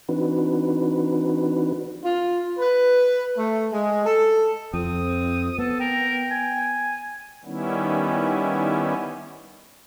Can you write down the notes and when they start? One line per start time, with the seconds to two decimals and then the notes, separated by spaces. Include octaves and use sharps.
0.09 E3 C4 D4 D#4 F#4 B4
2.04 F4
2.58 B4
3.37 A3
3.71 G#3
4.03 A4
4.74 F2 C4 D#6
5.58 B3 A4
5.80 A#4 G5
6.31 G#5
7.45 D#3 G3 B3 C#4 E4